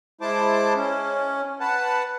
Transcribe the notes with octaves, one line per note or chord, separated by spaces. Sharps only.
G#3 E4 C5 A5 D6
C#4
B4 F#5 A5